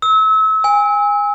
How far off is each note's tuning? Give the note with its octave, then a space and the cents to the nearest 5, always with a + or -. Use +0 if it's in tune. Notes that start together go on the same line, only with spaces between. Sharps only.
E6 -35
G#5 -25